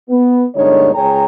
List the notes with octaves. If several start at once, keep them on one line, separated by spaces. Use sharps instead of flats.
B3
G1 A#2 D3 G#3 D#4 C#5
C#2 G#4 C#5 G5 A#5